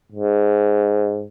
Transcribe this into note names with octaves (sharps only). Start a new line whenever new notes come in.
G#2